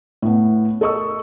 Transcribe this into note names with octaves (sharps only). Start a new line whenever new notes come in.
A2 B3
A4 A#4 D#5 C#6 D#6 E6